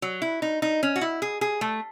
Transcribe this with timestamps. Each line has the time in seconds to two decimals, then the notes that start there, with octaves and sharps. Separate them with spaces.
0.02 F#3
0.22 E4
0.42 D#4
0.62 D#4
0.83 C#4
0.96 F#4
1.01 E4
1.22 G#4
1.41 G#4
1.61 A3